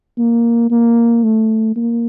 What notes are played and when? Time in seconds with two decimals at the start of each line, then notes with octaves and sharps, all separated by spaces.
0.18 A#3
0.71 A#3
1.24 A3
1.76 A#3